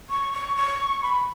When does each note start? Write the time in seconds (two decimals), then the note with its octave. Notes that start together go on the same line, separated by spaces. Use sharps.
0.10 C#6
0.33 C#6
0.56 C#6
1.02 B5